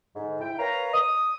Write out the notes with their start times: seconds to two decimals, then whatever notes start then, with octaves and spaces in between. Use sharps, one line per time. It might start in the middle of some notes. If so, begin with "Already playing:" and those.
0.16 G#2 D3
0.41 E4 G5
0.59 A#4 B4 C#5 F5 A#5
0.94 D#6